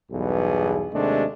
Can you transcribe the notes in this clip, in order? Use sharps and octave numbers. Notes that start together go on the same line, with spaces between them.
B1 E2 G2 B3 G#4
D#2 C3 G#3 A3 D4